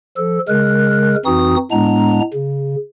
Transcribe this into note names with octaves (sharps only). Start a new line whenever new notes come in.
F3 A4
C#3 G#3 A#4 F#6
F2 E3 C4 D#4 F#4 D#6
A2 G#3 B3 D4 A#5
C#3